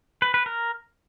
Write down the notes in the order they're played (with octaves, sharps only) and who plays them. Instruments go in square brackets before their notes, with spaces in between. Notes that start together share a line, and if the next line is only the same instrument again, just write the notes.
[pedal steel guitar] B4
B4
A#4